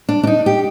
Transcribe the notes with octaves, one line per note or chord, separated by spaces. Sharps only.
D4
D4
D#4
G4